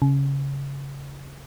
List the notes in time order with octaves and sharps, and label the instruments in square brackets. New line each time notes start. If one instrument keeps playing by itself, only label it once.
[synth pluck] C#3